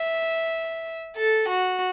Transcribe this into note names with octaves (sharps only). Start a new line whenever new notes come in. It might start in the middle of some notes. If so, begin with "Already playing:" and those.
Already playing: E5
A4
F#4